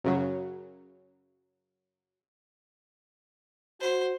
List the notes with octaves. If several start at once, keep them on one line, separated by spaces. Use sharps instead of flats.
F#2 C#3 F#3
F#4 C5